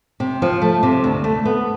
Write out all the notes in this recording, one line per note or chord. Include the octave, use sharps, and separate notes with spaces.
C3
F3
A3
C3
D2
A3
B3